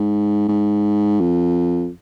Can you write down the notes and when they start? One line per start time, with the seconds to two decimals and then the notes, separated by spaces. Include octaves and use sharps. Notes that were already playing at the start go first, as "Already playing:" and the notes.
Already playing: G#2
0.48 G#2
1.21 F2